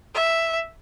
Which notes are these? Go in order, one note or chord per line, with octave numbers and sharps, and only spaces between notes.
E5